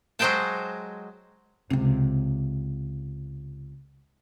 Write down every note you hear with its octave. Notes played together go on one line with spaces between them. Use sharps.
F#3 G#3 C5 D#5 G5 A5
C#2 C3